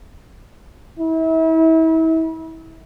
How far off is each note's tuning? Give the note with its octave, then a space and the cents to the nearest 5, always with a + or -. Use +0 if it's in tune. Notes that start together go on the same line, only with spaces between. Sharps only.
E4 -35